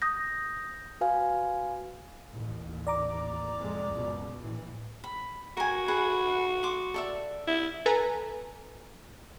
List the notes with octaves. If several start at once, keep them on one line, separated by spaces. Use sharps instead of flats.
D#6 G6 A#6
F#4 B4 F5 G#5
A1 D#2
D5 A#5 D6
F2 C3 G#3
C#2 F#2 B2
A#1 A2 E3
B5
F#4 A#4 G#5
G#4 B4 F#5
C6 D6
A4 D5 E5
E4
A4 B4 G#5 A#5